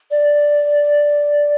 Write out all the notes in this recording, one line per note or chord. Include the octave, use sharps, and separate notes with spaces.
D5